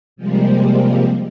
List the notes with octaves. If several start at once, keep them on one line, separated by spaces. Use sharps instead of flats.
C3 F3 G3 G#3 A#3 C4